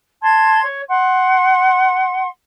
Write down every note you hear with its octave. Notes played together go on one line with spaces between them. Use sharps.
A5 C6 G#6
C#5
F#5 C6